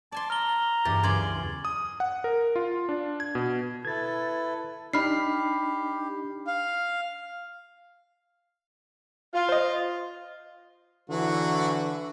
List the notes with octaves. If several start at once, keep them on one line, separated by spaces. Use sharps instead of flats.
D5 G#5 A5 C6
A#5 E6 F6 G7
E2 G2 G4 A6
C#2 F#2 D5 G#5 C6 G#6 F#7
D#6
F#5
A#4
F4
D4
G#6
B2
E4 A4 B4 G#6 A6
D4 D#4 G4 B5 F6 C7
F5
F4
C5 D#5
D3 E3 F#3 F#4